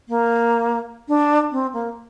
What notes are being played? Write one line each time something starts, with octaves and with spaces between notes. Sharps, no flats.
A#3
D4
C4
A#3